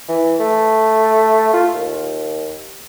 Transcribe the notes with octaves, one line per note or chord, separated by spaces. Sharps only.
E3
A3
F4
D#2